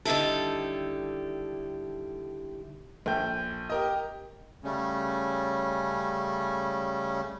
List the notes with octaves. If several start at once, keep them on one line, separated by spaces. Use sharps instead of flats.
D3 D#3 G3 E4 A4
A#1 A4 G5 G6
G4 A#4 D#5
C#3 G3 A3 C#4